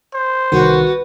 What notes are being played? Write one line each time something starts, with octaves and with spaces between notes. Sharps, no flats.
C5
C2 D#3 B3 F#4